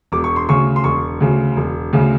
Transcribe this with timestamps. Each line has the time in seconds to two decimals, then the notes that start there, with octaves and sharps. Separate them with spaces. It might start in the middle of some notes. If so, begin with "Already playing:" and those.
0.12 E1 D6
0.24 C#6
0.36 C6
0.49 D2 C#3 C#6
0.76 C6
0.84 E1 C#6
1.21 D2 C#3
1.56 E1
1.93 D2 C#3